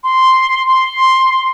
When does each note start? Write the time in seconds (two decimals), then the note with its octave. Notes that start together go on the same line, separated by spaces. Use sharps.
0.04 C6
0.67 C6
1.30 C6